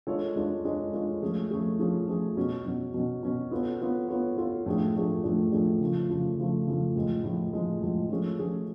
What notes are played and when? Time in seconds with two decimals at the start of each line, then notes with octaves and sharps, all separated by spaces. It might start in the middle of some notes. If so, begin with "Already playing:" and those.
0.07 G#3 D4 F4 A4 C#5
0.36 G#3 D4 F4 A4 C#5
0.65 G#3 D4 F4 A4 C#5
0.93 G#3 D4 F4 A4 C#5
1.22 F3 A3 C#4 G#4
1.51 F3 A3 C#4 G#4
1.79 F3 A3 C#4 G#4
2.08 F3 A3 C#4 G#4
2.37 B2 F#3 C#4
2.66 B2 F#3 C#4
2.94 B2 F#3 C#4
3.23 B2 F#3 C#4
3.51 B3 F4 A4 C#5
3.81 B3 F4 A4 C#5
4.09 B3 F4 A4 C#5
4.37 B3 F4 A4 C#5
4.66 A2 F3 A3 D4 G#4
4.95 A2 F3 A3 D4 G#4
5.24 A2 F3 A3 D4 G#4
5.52 A2 F3 A3 D4 G#4
5.81 C#3 F3 A3
6.09 C#3 F3 A3
6.38 C#3 F3 A3
6.67 C#3 F3 A3
6.96 A2 F3 G#3
7.24 A2 F3 G#3
7.53 A2 F3 G#3
7.82 A2 F3 G#3
8.10 F3 A3 C#4 G#4
8.39 F3 A3 C#4 G#4